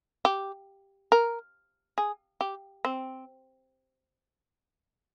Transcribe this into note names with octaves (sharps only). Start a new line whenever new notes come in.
G4
A#4
G#4
G4
C4